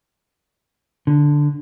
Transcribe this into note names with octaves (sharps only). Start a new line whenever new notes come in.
D3